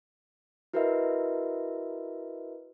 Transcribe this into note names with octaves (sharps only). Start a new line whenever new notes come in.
E4 F#4 A#4 B4 D#5 E5